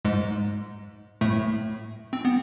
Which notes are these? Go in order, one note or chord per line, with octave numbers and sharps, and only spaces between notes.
G#2 G#3
A2 A3
C4
B3